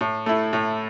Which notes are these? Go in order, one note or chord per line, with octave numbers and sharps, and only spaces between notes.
A2
A3 E4
A2